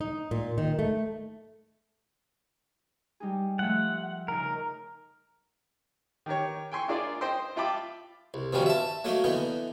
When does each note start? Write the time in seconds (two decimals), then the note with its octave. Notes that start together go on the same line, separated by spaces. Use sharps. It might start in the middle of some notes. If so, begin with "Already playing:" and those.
0.01 D#4
0.31 A#2
0.58 D#3
0.79 A3
3.20 G3 D#4 G#4
3.59 F3 A3 E5 F#5
4.28 C#3 D#4 A#4
6.26 D#3 G4 A#4 C#5
6.72 G5 G#5 C6 C#6
6.88 D4 E4 F4 G#4 A#4 D5
7.21 C5 D#5 G5 C6
7.56 F4 E5 G5 A5 B5 D6
8.34 C2
8.53 G2 B2 D#3 F3 G3 C#4
8.66 E5 A5
9.05 F#3 A3 A#3 D#4
9.24 D3 E3 B3 D#4